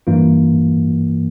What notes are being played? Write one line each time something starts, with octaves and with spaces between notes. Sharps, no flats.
G2 E3 A#3 F4